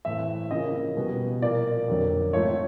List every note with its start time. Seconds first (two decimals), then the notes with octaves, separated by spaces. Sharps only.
0.05 A2 E3 A3 C4 E5
0.51 C#3 F3 A#3 D#5
0.97 B2 G3 B3
1.42 A#2 F3 A#3 D5
1.88 F2 D3 F#3 A#3
2.33 G#2 F3 A3 C4 C#5